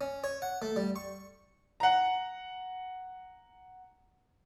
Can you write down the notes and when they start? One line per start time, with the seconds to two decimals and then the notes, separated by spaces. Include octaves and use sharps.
0.01 C#4
0.24 C#5
0.42 F#5
0.62 A3
0.76 G3
0.96 C#6
1.80 F#5 A#5